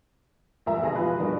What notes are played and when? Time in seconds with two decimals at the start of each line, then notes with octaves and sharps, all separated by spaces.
0.66 F1 C#2 F3 A#4 E5 A#5
0.82 D2 B2 G#4 A5 D#6 A#6
0.95 F3 F4 G4 B4
1.20 G2 B2 G3 A#3